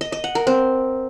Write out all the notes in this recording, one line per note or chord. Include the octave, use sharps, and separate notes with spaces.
D#5
D#5
F#5
A#4
C4